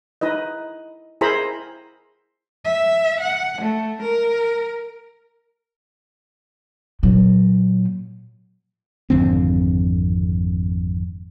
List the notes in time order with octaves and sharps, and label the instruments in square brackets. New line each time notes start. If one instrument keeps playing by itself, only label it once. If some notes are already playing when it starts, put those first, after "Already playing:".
[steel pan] D#4 E4 B4 D#5
E4 G#4 A#4 C5 A#5 B5
[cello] E5
F#5
A3
A#4
[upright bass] A#2 F#3
[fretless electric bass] G#1 F2 D3 C4